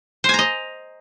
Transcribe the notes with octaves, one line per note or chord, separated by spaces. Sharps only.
C5 D#5 G#5 A#5